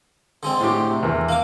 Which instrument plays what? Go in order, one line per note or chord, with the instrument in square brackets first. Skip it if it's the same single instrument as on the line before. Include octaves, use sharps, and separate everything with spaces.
[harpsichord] D3 G#3 C4
[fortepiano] A2 G4
C3
E2 A#4
[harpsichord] A#3 D6